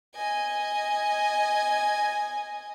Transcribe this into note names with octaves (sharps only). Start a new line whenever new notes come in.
D#5 G#5